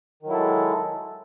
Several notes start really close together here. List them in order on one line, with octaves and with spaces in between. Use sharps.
D#3 F#3 E4 A4 G#3